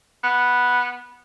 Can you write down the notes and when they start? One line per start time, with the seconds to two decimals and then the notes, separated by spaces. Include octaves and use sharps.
0.24 B3